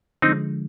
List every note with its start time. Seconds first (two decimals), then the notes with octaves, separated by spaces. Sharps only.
0.22 D3 F3 G#3 C4 D#4